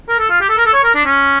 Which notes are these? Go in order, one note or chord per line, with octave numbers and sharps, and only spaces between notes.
A#4
A4
F4
G4
A4
A#4
A4
C#5
A#4
D4
C#4